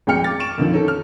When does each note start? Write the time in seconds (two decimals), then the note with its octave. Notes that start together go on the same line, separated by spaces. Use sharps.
0.07 G#1 F2 G#3 G5 F6 C#7
0.24 D6 A6
0.40 C#6 D7 E7
0.58 F2 D3 D#3 F3
0.72 C#4 D#4 A4
0.88 F6